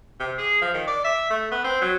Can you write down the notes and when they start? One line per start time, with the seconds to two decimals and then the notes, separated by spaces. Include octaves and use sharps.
0.20 C3
0.38 G#4
0.62 F3
0.74 D#3
0.87 D5
1.04 E5
1.30 A3
1.52 B3
1.64 C4
1.81 F#3